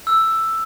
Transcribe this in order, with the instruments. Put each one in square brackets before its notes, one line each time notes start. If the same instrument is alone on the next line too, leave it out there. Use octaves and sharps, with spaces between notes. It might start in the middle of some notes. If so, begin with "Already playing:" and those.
[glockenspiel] E6